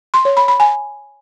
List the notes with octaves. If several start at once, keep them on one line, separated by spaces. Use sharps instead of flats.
C6
C#5
B5
B5
G#5